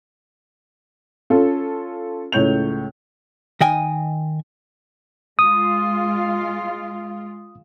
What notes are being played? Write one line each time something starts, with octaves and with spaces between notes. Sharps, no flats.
C#4 F4 A4
C#2 A2 C#5 G6 F7
D#3 D#5 G5 G#5
G#3 F4 D#6